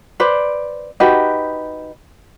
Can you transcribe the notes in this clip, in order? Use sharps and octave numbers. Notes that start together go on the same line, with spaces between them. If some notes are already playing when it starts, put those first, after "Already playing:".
B4 C5 D5
D#4 F#4 G4 B4